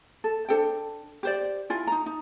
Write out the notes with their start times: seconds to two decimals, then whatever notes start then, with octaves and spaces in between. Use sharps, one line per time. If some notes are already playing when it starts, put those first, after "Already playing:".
0.24 A4
0.49 D4 A4 C5 G5
1.23 G4 C5 D5
1.70 E4 F4 G#5
1.87 D#4 A#5
2.06 D#4